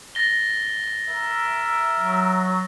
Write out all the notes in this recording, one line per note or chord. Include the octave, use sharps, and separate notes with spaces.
A6 A#6 G7
A#4 E5
F#3